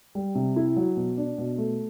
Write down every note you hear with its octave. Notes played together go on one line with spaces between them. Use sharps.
G3
C3
E4
F#3
B2
D4
B2
A3